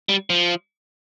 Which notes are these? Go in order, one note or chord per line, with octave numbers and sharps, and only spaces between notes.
G3
F3